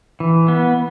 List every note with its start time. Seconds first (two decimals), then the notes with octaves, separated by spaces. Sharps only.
0.20 E3
0.48 B3